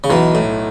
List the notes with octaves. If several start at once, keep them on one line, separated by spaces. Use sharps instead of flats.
C#3
B1 B2 E3
A2 A3